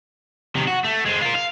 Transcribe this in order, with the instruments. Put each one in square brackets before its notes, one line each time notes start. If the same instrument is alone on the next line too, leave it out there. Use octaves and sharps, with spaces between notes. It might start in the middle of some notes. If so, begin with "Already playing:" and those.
[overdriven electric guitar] C3 D#3
F#4
A3
G#3 C4
F4 A#4
F5